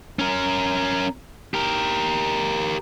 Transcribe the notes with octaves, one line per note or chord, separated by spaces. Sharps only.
C#4 A#4
G4 A#4